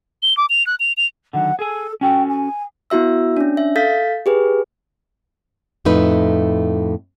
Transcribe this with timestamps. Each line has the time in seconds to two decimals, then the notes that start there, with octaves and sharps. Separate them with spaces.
0.22 G7
0.37 D6
0.49 F7
0.67 F#6
0.80 F7
0.97 F7
1.33 D3 D#3 F#3 F#5
1.59 G#4 A4 G#5
2.01 C#4 F#4 A4 G5
2.28 G#5
2.90 B3 E4 F#4 E5 E6
3.37 C#4 D4
3.57 E5
3.76 A4 F5 G6 A6 B6
4.26 G4 G#4 B4
5.85 F2 A2 A3 D#4 B4